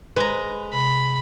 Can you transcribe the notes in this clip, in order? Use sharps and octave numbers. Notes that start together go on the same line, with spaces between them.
G#3 B4 A#5
C3 B5